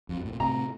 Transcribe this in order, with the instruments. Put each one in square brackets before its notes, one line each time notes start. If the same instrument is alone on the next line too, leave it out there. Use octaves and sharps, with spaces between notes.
[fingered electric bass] F2
G2
A2
A#2
[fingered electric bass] A2 C3 [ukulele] A#5